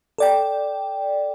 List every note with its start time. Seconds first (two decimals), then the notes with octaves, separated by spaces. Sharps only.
0.18 A4 D5 G5